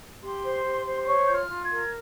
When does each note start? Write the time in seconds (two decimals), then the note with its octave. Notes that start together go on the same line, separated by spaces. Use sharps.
0.21 G4 C6
0.42 C5
0.64 G4
0.85 C5
1.01 C6
1.06 C#5 C#6
1.27 F4 G6
1.35 F6
1.48 F4
1.63 G#6
1.71 A#4